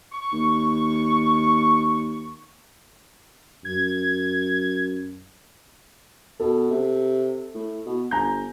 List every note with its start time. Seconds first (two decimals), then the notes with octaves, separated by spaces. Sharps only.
0.13 C#6
0.32 D#2
3.65 F#2 G#6
6.40 B2 A4
6.70 C3
7.54 A2
7.85 B2
8.11 G1 G#5 A#5 G6